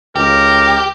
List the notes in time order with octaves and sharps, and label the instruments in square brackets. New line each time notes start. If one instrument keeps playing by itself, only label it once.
[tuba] C#2 [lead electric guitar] G4 [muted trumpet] A#4